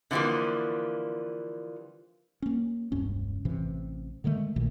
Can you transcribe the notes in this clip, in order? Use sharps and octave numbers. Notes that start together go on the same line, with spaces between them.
D3 E3 F3 G3 A#3
A#3 C#4
E1 C#2 G2 C#4
A1 A2 C3 E3
D3 D#3 G#3 A3
A#1 A#2 D#3 A3